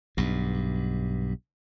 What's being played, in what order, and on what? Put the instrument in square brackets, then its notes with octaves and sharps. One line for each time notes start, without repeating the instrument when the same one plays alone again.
[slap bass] B1 G2